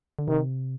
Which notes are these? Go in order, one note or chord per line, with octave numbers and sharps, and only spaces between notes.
D3
C3 D#3